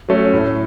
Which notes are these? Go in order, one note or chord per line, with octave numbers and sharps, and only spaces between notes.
F#3 A3 C#4
A2